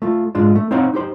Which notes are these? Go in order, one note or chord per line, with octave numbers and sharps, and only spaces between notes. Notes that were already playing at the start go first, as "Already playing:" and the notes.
A3 F4
G#2 G#3 D4 F4
A3
C4 D#4 C5 C#5 F5 F#5
D#4 G4 C5